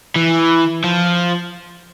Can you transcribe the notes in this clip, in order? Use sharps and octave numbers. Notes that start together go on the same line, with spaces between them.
E3
F3